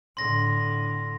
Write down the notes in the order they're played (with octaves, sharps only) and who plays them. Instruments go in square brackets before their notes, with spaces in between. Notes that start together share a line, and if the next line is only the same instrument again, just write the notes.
[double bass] A2 D3 [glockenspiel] C6 A#6